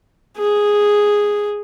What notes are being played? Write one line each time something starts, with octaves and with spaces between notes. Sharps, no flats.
G#4